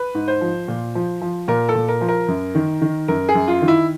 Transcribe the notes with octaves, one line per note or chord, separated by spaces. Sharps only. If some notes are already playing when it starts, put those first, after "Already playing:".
Already playing: B4
G#2
C5
F3
A#2
F3
F3
A#2 A#4
A4
A#2
A#4
F3
A#4
F#2
D#3
D#3
F#2 A#4
G#4
F#2
F4
D#3
E4